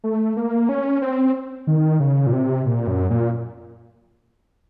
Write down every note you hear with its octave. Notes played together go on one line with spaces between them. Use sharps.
A3
A#3
C#4
C4
D#3
C#3
A#2
C3
A#2
F#2
A#2